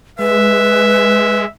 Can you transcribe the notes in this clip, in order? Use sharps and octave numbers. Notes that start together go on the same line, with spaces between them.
G#3 B4 E5